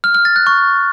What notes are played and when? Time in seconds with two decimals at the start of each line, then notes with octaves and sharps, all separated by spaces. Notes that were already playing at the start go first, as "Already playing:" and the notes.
0.04 F6
0.14 F6
0.25 A6
0.36 F#6
0.47 C#6